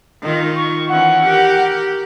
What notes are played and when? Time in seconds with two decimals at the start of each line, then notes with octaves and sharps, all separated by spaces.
0.22 D#3 F4
0.56 C#6
0.89 E3 C#4 F#5
1.26 G4 A#4